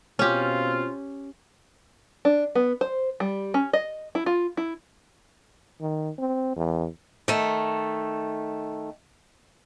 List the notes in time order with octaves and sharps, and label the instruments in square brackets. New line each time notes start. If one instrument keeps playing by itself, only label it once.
[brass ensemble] B2 C4 F4 [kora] C#4 G4
[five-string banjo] D4
B3
C5
G3
C#4
D#5
E4
F4
E4
[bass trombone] D#3
C4
E2
[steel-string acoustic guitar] D#3 A3